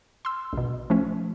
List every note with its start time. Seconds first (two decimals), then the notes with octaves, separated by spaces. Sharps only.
0.25 C6 E6
0.53 A#1 B2
0.90 F3 A3 C#4